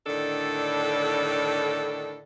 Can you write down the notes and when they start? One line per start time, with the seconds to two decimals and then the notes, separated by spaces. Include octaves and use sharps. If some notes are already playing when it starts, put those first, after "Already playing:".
0.07 A2 D3 D#3 D4 A4